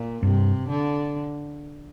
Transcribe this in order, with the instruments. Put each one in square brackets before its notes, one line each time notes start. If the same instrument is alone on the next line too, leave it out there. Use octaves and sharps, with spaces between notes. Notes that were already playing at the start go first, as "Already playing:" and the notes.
Already playing: [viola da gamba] A#2
[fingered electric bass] G2 [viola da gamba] C3
[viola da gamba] D3